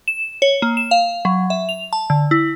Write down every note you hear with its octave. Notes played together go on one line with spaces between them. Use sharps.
E7
C#5
A#3
E7
F5
F#3
E5
F7
A5
D3
E4